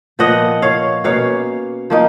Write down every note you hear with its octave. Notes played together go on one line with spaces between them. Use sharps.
A#2 F3 B3 D#5 F#5
C#5 F5
B2 A#3 C#4 C#5 F5
F3 A#3 D#4